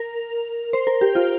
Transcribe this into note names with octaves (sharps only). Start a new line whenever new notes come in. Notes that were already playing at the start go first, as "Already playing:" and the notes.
Already playing: A#4
C5
A#4
G4
F4